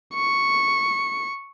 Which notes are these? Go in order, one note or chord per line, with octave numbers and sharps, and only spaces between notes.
C#6